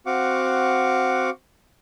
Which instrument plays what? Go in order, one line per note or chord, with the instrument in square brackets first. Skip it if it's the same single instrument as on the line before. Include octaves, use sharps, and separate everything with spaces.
[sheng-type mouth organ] C4 F#4 F5 F#5 C#6 D6